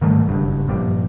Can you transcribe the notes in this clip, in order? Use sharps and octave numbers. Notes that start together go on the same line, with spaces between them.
G#2 D#3 G3 A3
F#1 G2
A#1 G2 G3